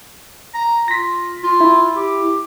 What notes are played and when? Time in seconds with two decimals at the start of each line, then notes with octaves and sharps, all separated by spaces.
0.55 A#5
0.88 F4 A#6 B6
1.43 F4
1.61 E4
1.96 G4